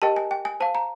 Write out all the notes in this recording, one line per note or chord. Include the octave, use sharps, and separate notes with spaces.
G4 A#4 D#5 G5 A5
G#5
G5
G#5
C5 F5 A5
A#5